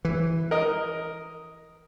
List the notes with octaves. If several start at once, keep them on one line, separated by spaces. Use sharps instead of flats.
E3
A#4 D#5